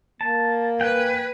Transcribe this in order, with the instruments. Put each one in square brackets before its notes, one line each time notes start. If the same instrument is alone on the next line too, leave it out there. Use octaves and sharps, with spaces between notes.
[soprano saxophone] A#3 [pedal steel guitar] A5
[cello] B4 [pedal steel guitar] G5 G#5